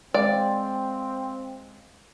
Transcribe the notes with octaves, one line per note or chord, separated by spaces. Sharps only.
G#3 C4 D5 F5